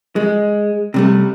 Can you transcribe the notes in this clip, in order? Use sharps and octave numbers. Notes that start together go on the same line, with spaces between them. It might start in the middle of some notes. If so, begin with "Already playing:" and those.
G#3
C3 G3 A3